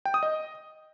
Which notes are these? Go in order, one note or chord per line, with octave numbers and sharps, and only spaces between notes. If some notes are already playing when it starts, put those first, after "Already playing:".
G5
D#6
D#5